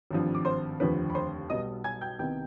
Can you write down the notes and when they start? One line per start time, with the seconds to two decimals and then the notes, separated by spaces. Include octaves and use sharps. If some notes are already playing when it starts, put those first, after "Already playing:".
0.11 G#1 G2 F3
0.35 D6
0.45 C5 C6
0.80 F1 D#2 D3 F3 C4 B4 B5
1.10 B5
1.15 C5 C6
1.50 B1 B2 G3 B3 D#5 D#6
1.84 G#5 G#6
2.01 G5 G6
2.19 C2 C3 D#3 B3 G5 G6